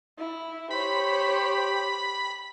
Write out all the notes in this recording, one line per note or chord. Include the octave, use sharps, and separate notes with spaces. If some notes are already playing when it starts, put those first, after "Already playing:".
E4
G4 C5 C#5 B5